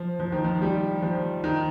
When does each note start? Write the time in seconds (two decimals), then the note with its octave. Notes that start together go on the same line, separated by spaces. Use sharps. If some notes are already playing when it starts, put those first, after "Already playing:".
Already playing: F3
0.20 F3
0.32 D#3
0.44 F3
0.62 G3
1.02 F3
1.44 D#3